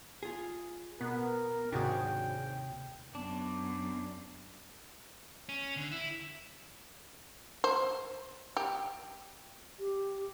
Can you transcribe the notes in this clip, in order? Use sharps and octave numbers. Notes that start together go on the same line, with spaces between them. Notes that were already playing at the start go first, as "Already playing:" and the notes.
F4 G#4
B2 B3 A#4
D#2 G#2 C3 D4 F#4 G#4 C#5 G5
F#2 B3 D4
C#4
D3
E4
C5
G4
G4